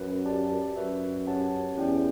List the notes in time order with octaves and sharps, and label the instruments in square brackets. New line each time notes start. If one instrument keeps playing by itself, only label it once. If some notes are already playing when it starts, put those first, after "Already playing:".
Already playing: [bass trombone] F#2 [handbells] B4
[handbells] G4 D5 A5
[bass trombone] F#2 [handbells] F#4 B4 E5
[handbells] C#4 G4 C#5 F#5 A5
[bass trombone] E2 [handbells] C#4 E4 G4 D5 G5